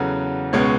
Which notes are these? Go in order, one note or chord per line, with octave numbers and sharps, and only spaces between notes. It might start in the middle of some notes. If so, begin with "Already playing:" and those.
Already playing: E2 C#3 F#3 B3 A4
C#2 B2 G#3 C#4